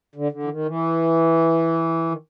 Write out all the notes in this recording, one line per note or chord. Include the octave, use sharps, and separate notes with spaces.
D3
D3
E3
D#3
E3
D#3